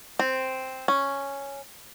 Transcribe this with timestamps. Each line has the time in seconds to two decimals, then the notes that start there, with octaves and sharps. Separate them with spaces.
0.19 C4
0.88 C#4